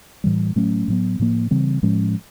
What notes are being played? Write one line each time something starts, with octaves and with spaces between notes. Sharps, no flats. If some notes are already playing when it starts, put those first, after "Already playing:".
A2 E3 G3
A2 F#3 A3 C#4
A2 F#3 B3
A2 F3 A#3
C#3 E3 G3 C4
A2 F3 G#3 C#4